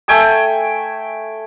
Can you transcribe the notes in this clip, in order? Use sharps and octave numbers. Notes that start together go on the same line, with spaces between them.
A3 G5 G#5 E6